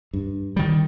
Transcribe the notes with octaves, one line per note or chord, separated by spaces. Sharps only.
G2
D#3 G3